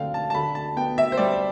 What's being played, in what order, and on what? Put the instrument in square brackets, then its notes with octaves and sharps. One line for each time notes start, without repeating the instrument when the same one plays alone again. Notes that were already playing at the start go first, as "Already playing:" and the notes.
Already playing: [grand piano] D3 C4 F5 G5
A5
A5
D3 B5
A5
B3 G5
E5
C5
G3 D5